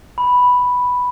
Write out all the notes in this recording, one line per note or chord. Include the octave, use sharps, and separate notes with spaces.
B5